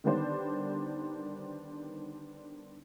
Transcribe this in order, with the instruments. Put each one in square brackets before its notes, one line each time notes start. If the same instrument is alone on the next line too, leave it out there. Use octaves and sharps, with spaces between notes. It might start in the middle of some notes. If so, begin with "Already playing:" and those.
[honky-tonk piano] D3 D#3 G3 B3 D4 C5